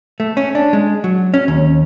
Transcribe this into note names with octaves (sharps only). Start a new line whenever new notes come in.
A3
C#4
D4
G#3
F#3
C#4
D#2